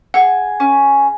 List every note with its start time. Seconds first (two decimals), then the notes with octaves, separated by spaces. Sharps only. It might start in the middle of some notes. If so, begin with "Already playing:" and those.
0.14 G#4 F#5
0.60 C#4